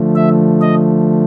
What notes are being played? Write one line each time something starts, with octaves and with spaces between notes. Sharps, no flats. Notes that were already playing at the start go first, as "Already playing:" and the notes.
Already playing: D3 F3 A3
E5
D#5